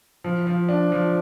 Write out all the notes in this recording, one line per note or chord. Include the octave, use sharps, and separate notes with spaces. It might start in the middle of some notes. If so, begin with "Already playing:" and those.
F3
F3
D4
F3